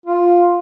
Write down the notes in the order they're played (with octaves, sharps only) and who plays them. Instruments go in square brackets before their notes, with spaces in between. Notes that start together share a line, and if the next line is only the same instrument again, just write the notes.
[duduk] F4